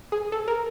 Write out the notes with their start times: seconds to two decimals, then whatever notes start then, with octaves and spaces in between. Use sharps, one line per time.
0.12 G#4
0.32 A4
0.48 A#4